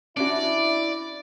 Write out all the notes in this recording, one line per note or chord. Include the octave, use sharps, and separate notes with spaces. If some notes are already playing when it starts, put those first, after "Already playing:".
C#4 D4 E4 F#4 D5